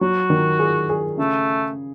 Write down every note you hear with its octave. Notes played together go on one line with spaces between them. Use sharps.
F#3 F#4
D#3
G#4
G#4
C#3 A3